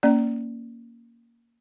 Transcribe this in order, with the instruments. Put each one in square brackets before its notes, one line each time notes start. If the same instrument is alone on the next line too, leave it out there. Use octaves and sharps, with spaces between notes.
[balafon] A#3 C#4 D5